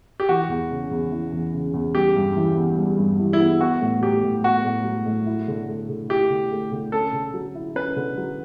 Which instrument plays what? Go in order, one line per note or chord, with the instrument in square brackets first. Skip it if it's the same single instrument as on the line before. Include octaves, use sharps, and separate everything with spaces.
[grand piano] G4
[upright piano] E3 [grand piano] F#4
[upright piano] E2
C#3
E2
E3
E2
C#3
E2
[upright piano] G3 [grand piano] G4
[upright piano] G2
E3
B3
G3
G2
E3
[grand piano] E4
[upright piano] B3
[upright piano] B3 [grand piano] F#4
[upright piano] A2
[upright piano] F#3 [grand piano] G4
[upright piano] A2
[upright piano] B3 [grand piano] F#4
[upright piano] A2
F#3
A2
E4
D3
A3
D3
[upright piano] E4 [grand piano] G4
[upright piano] D3
A3
D3
[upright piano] C#4 [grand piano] A4
[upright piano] D3
F#3
E4
[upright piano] C#4 [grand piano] B4
[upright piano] D3
F#3